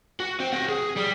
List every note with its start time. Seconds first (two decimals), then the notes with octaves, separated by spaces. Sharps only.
0.20 F#4
0.40 C4
0.53 G4 F#5
0.69 G#4
0.96 G3